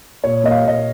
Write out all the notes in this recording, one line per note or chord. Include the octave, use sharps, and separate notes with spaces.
A#2 C#5
A#3 D#5
F5
A#2 D#5